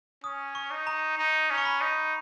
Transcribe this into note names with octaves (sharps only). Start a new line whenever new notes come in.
C#4 D#6
C#6
D#4
A#5
D#4
C#4
C#6
B5
D#4